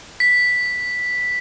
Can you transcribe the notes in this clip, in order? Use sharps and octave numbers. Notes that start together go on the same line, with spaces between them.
B6